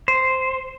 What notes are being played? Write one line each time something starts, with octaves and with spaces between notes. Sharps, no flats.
C5